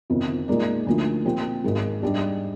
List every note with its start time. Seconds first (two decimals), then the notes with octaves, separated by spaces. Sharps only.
0.10 G1 F2 C3 D#3
0.48 A#2 G#3 D#4 A#4 D5
0.87 D2 D3 F3 A#3 D#4
1.25 A#2 F3 C4 G4 C5
1.64 G#1 G#2 D#3 G#3
2.02 G#2 G3 D4 G4